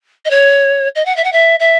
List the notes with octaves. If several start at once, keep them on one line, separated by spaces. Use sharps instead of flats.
D#5
C#5
D#5
F#5
E5
F#5
E5
E5